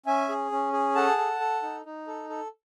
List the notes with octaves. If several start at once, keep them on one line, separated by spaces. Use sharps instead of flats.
C#4 E5 G#5
G#4
C#4
G#4
A4 F#5 A5
A4
A4
D#4
D#4
A4
A4